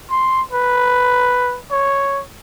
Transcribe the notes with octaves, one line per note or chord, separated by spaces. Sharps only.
C6
B4
C#5